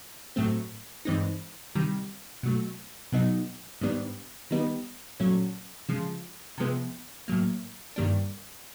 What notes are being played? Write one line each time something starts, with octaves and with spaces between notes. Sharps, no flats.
A2 F#3 A3 C4
G2 E3 G#3 C4 D#4
C3 D#3 G3
B2 F#3 A3
B2 F#3 B3 D#4
G#2 D#3 G3 B3 D4
D#3 G3 B3 D#4
A#2 F#3 A3 C#4
C#3 F3 G#3
C3 F3 G#3 B3
A2 F#3 A#3
G2 D#3 G3 A#3 D4